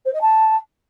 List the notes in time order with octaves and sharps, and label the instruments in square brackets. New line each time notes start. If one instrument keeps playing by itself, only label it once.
[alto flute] C5
D#5
A5